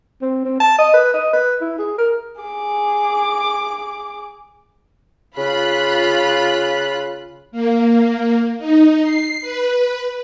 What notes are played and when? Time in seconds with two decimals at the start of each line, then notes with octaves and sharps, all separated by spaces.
0.22 C4
0.45 C4
0.60 A5
0.79 D#5
0.94 B4
1.14 D#5
1.33 B4
1.61 E4
1.79 G#4
1.98 A#4
2.41 G#4 D6
5.37 C#3 F4 B5 F#6
7.52 A#3
8.58 D#4
9.03 C7
9.41 B4